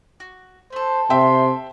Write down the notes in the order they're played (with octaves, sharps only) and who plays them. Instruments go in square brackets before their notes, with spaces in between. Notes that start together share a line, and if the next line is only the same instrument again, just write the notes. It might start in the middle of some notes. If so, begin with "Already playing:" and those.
[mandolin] F#4
[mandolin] A3 A4 [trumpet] C5
[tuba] C3 [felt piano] E5 G5 [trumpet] C6